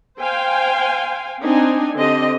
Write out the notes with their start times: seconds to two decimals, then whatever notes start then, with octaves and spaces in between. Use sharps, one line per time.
0.20 C5 F5 G5 G#5
1.42 C4 D4 D#4 G#5
1.97 D3 C4 G4 D#5